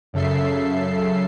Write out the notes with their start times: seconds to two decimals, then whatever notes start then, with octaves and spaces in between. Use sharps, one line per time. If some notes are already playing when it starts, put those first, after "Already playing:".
0.13 F#2 C#3 A4 E5 C7